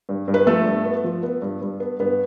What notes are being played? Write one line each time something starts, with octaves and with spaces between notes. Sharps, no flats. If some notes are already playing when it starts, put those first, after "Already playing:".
G2
G2
B4
F3 A3 A4
G2
B3
F3
B3
G2
G2
B3
G2 B3 B4